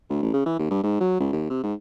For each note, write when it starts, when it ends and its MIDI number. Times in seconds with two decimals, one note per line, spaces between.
0.10 0.21 38
0.22 0.30 33
0.34 0.43 49
0.46 0.56 52
0.59 0.67 39
0.71 0.80 43
0.83 0.98 44
1.00 1.18 54
1.20 1.29 37
1.33 1.47 39
1.50 1.59 48
1.64 1.74 44